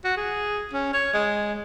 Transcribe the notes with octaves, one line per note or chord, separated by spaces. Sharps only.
F#4
G#4
C#4
C#5
G#3